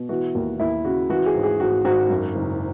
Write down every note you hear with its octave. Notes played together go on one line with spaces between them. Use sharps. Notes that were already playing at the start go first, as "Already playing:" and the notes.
Already playing: B2
E3 F#4
D#2
D#2 E4
C#3 F#4
E3 F#4
G#4
G#1
G#4
G#1 F#4
G#1 F#4
F#2
F#1